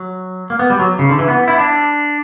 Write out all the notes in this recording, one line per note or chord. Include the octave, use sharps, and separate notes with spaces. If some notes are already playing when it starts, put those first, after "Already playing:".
Already playing: F#3
A#3
B3
G3
F#3
C#3
D3
E3
B3
E4
D4